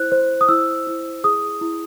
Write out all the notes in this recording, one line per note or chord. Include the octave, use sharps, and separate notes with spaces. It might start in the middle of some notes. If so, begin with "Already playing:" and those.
Already playing: E4 C5 F#6
C5
D#6
E4 E6
E4
G#4 D#6
E4